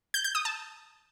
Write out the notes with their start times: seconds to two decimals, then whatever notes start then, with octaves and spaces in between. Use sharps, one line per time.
0.14 G6
0.24 G6
0.35 D#6
0.45 A5